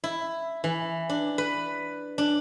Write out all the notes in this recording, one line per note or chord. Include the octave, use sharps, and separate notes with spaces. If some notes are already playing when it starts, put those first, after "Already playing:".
E4
E3
D4
B4
D4